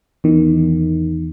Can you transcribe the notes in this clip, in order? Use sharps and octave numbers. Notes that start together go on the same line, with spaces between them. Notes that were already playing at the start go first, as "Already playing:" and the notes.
E2 D#3